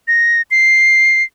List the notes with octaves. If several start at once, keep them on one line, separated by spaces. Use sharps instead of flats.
A#6
C7